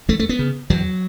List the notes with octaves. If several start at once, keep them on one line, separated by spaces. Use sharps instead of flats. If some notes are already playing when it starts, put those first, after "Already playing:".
E2 A3
A3
B3
C#3
E2 F#3